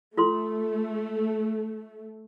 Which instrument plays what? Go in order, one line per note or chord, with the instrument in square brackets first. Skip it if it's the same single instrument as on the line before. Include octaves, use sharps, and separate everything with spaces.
[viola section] A3 [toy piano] F4 A4 C6